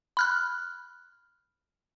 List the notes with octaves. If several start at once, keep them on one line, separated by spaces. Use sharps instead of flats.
B5 F6 F#6